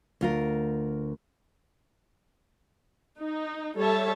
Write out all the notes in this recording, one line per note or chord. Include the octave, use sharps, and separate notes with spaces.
D2 F4 A#4
D#4
G3 A4 C#5 E5 A5